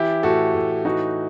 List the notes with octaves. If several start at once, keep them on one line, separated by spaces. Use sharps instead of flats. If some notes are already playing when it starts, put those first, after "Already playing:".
Already playing: E3 E4 G4
A2 F#4 A4
A2
E3 D#4 F#4